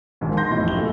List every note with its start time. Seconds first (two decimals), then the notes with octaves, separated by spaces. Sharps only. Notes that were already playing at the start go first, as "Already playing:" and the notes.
0.21 A#1 G#2 D#3
0.37 D#4 C6 G6 A#6
0.51 A1 F2 A2 D#5
0.64 F#1 G4 G7
0.76 A#2 C#3 G#3 A3